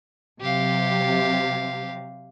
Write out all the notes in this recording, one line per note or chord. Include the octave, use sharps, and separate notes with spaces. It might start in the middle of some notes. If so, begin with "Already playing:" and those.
C3 F#3 G4 F5